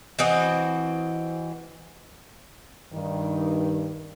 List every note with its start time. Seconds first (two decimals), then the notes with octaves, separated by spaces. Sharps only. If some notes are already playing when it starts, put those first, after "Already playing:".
0.19 E3 C4 F#4 D#5
2.93 G2 D#3